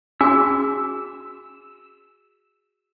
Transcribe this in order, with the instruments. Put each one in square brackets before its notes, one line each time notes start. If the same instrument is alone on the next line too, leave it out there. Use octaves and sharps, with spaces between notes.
[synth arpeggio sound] C#4 C6 [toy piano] F#4 G#4 G#5 [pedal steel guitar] E6